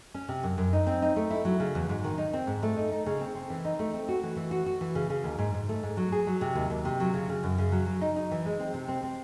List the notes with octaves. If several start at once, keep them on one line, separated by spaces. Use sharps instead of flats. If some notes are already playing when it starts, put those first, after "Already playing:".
C#4
C3
F#2
F#2
D#4
C4
D#4
A3
E4
F#3
C#3
E2
G#2
D#3
D#4
C4
G#2
A3
D#4
D#4
C#3
C4
C4
E3
D#4
A3
C4
F#4
E3
E3
F#4
F#4
E3
C#3
C#3
D#2
G#2
G#2
A3
G#2
F#3
G#4
F#3
C3
D#2
D#2
C3
F#3
C#3
C#3
F#2
C#3
F#3
F#3
D#4
D#4
E3
G#3
C4
C3
C4
C4